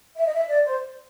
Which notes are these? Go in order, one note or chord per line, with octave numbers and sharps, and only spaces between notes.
E5
D#5
E5
D5
C5